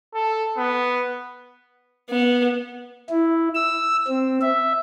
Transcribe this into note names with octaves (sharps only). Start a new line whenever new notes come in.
A4
B3
B3
E4
E6
C4
E5